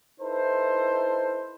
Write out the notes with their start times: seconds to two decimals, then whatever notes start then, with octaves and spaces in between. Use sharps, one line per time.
0.21 D#4 E4 A4 B4 C5